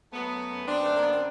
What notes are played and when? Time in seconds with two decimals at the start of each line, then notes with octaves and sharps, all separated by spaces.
0.13 F#3 A3 B3
0.31 F#2
0.49 F#2
0.67 F#2 C4 D4
0.84 D3 A3
0.94 A#3
1.03 F#2 B3
1.12 C4